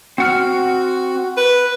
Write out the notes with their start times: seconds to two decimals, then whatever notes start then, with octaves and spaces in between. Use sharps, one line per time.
0.18 C4 F#4 F#5 F6
1.37 B4